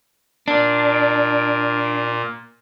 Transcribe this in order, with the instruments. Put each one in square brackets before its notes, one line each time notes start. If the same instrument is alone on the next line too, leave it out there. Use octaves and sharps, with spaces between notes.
[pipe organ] A#2 [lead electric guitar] D4